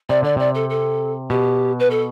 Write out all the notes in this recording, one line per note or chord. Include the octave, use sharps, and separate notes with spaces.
C3 D5
D3 D5
C3 D5
A4
A4
B2 G4
B4
A4